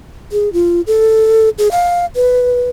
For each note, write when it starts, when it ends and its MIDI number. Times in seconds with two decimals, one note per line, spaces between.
0.32 0.52 68
0.53 0.81 65
0.87 1.49 69
1.58 1.71 68
1.71 2.05 77
2.16 2.70 71